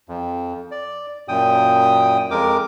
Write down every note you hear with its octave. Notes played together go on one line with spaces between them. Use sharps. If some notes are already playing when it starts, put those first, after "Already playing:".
F2
D5
F#2 A#2 G5 D#6
F2 G#3 A#4 D6